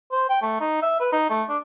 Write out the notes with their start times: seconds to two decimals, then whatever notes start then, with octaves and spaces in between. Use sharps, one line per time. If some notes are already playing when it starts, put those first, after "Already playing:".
0.12 C5
0.29 G5
0.42 A3
0.61 D#4
0.82 E5
1.00 B4
1.12 D#4
1.30 A3
1.49 D4